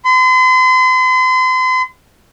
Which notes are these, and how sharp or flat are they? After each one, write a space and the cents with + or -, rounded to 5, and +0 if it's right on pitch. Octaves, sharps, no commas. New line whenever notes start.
C6 -40